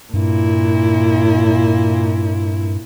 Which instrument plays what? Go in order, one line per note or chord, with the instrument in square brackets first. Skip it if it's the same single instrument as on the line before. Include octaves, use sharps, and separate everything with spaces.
[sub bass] G2 [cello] A#2 E4